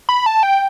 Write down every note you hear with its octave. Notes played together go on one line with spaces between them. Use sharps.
B5
A5
G5